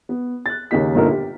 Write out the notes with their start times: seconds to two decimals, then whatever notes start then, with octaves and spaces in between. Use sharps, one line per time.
0.09 B3
0.46 F#6 A6
0.71 D#2 C#3 A#3 D#4 B6
0.95 G1 A#2 D3 D#4 A4 A#4
1.11 G4